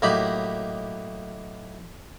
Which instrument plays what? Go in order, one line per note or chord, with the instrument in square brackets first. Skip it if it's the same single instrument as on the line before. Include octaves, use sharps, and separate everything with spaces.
[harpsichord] A2 F#3 A#3 D#4 G4 B5